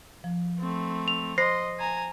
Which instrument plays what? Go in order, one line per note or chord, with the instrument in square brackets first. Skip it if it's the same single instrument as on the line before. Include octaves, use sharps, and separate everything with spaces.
[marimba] F3
[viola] A3 C4
[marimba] E6 [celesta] F7
[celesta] C5 A#6 C7 [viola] D#5 C6 [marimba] B5
[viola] G#5 A#5